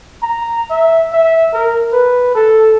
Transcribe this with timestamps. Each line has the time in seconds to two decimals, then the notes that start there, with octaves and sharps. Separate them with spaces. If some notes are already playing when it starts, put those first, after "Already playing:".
0.23 A#5
0.70 E5
1.13 E5
1.54 A#4
1.93 B4
2.35 A4